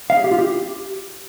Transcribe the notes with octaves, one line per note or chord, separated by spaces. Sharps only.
F5
G#4
G4
F4
G4